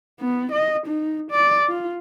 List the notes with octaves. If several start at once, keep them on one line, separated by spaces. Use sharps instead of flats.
B3
D#5
D#4
D5
F4